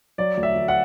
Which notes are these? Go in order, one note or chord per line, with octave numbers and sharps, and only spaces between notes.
F#3 D5
D2
E5
D2
F#5